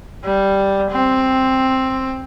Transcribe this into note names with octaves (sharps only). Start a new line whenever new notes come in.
G3
C4